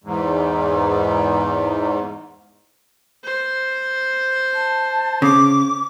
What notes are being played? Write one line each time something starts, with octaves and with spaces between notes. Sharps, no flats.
E2 G#2
C5
A5
C#3 D6